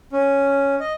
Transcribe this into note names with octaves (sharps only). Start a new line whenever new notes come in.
C#4
D#5